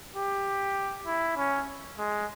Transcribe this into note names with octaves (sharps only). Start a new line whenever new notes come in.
G4
E4
C#4
G#3